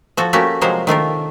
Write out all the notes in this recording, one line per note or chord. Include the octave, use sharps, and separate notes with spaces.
F3 F#4 A4
A3 A#3 C#4 F#4 G4
C3 F3 F#3 G#3 A#4 C5
D#3 A3 F4 A#4